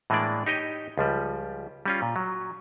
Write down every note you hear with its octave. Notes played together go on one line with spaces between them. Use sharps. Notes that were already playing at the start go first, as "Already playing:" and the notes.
A2 E3 G#3 A#3 D4 D5
D#4 G4 C#5 D#5
C#2 F3 G3
G3 C#4 F4
A#2
F#3